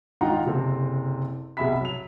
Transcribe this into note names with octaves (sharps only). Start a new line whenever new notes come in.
G#1 D#4 F4 F#5 G5 A#5
F#1 C3 C4 A4
B1 C3 G#4 E5 B5 B6
F#3 F7